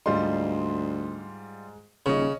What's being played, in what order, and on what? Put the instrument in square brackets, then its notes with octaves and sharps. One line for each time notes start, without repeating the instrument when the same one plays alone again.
[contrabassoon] D2 [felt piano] G#2 D#5 [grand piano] G3 F4 C6
[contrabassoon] D#1 [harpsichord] C#3 [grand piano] C#4 D#5 [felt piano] C#6